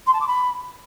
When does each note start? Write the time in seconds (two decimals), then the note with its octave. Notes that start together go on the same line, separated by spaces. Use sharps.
0.06 C6
0.13 A5
0.20 D6
0.27 B5